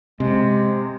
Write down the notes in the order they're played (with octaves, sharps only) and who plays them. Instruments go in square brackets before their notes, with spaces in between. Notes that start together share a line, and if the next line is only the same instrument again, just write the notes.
[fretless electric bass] C3 [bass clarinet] G#3